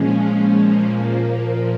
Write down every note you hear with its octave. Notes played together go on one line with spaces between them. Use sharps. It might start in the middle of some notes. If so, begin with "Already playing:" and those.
Already playing: A#2 F3 G#3 C#4
A#2 F3 A#3